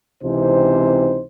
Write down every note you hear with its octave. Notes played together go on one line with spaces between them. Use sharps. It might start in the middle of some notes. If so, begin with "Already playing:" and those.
C#2 C3 E3 C4 D#4 C5